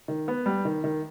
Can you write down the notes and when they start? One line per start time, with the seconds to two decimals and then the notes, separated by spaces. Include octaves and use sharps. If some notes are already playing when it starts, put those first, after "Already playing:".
0.08 D#3
0.28 B3
0.46 G3
0.65 D#3
0.84 D#3